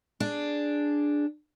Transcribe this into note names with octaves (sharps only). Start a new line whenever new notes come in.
D4 G#4